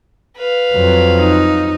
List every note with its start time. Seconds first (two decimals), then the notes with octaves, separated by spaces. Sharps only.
0.37 B4 F5
0.74 F2 F#3
1.20 D#4